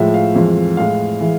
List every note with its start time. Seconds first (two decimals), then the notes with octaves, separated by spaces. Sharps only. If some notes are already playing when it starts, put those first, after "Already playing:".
Already playing: A2 F3 G#3 E5
0.14 F5
0.35 F2 E3 G#3
0.77 A2 G#3 F5
1.21 E3 G#3